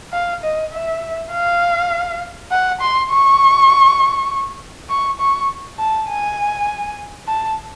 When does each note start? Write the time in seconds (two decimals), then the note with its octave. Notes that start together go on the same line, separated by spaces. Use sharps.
0.13 F5
0.43 D#5
0.73 E5
1.32 F5
2.51 F#5
2.81 C6
3.11 C#6
4.89 C#6
5.19 C#6
5.79 A5
6.08 G#5
7.27 A5